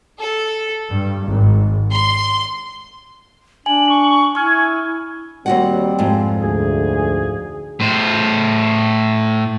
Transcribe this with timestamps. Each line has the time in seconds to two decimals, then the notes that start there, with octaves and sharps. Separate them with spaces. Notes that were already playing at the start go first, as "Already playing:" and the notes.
0.21 A4
0.89 G2
1.26 G#1
1.92 C6
3.66 D4 G#5 F#7
3.89 C#6
4.35 E4 G#5 C#6 F6
5.46 D#2 G3 C4 F#4 F#5
5.99 F2 G#2
6.41 D2 G#4
7.80 A2 C5